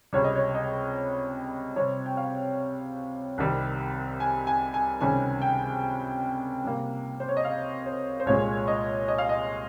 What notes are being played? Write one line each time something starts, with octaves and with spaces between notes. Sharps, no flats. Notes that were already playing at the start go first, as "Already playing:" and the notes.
C#2 C3 G3 C#5
D#5
C#5
D#5
C3 G3 C4 C#5
G5
F5
C2 C3 D#3 G3
G#5
G#5
G#5
C#2 C3 D#3 G3 C#4 G#5
G5
C3 G3 A#3
C5
C#5
D#5
F5
C5
C5
C2 A#2 G#3 C#5
D#5
D#5
F5
D#5